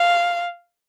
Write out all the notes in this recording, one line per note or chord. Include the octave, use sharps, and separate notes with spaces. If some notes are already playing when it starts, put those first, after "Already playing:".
Already playing: F5